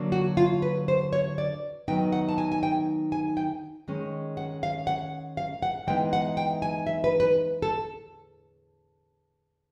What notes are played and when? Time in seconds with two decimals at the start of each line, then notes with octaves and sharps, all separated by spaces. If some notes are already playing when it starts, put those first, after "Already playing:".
Already playing: D3 F#3 A#3 D4
0.12 F#4
0.37 F4
0.62 B4
0.88 C5
1.13 C#5
1.38 D5
1.88 D#3 F#3 B3 D#4 G5
2.12 F#5
2.29 A5
2.38 G#5
2.52 G#5
2.63 G5
3.12 G#5
3.37 G5
3.88 D#3 G#3 C#4
4.37 F#5
4.63 F5
4.87 F#5
5.37 F5
5.63 F#5
5.87 E3 G#3 B3 D#4 G5
6.13 F#5
6.37 G5
6.62 G#5
6.87 E5
7.04 B4
7.20 B4
7.62 A4